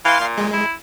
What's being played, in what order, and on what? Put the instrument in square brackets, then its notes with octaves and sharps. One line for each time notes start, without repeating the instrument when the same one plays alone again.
[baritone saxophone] E3 [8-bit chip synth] F5 C6
[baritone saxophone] A#2
[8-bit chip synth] G#3
[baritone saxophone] E4